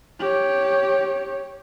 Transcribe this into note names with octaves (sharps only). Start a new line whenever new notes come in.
G4 C#5